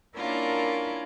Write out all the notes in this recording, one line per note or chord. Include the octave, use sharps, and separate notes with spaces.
A#3 C#4 D4 E4 F4 A#4